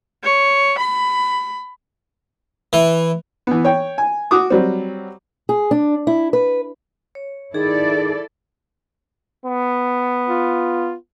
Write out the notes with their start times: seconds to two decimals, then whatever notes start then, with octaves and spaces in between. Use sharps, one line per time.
0.24 C#5
0.79 B5
2.73 E3
3.47 E3 B3
3.65 C#5 G5
3.98 G#5
4.31 F#4 D6 D#6
4.50 F#3 G3 C4
5.49 G#4
5.71 D4
6.07 E4
6.33 B4
7.15 C#5
7.54 D#3 E4 G#4 A4 D5
9.45 B3
10.28 F4